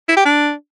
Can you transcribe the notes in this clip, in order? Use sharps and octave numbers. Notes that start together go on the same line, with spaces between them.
E4
G4
D4